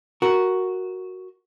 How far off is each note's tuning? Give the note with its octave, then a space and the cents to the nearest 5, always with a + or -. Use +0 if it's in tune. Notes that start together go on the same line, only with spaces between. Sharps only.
F#4 +0 A#4 +0